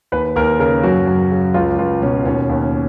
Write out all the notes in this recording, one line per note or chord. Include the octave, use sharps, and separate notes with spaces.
D#2 B4
D#2 A#4
C#3 A#4
F#2 F#4
F#2
C#3
C#2 F4
C#2 F4
B2 C#4
D#2 C#4
D#2
C#4